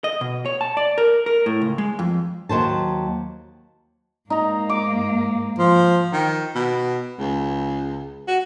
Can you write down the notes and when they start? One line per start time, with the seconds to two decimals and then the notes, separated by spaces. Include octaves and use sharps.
0.04 D#5
0.21 B2
0.46 C#5
0.61 A5
0.77 D5
0.98 A#4
1.26 A#4
1.46 A2
1.62 C#2
1.78 G#3
1.99 F2
2.49 D#2 F#3 C5 A5
4.30 G#2 A#3 D#4 A#5
4.69 D6
5.59 F3
6.13 D#3
6.55 B2
7.20 C#2
8.28 F#4